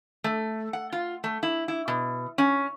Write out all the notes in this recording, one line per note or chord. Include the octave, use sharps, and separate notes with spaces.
A3
F#5
F4
A3
E4
E4
B2
C#4